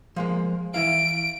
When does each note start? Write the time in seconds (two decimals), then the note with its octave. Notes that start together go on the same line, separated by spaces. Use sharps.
0.16 F3 G#3 A#3
0.74 E3 E4 F5 D7